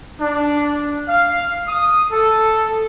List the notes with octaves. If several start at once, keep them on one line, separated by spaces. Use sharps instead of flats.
D4
F5
D#6
A4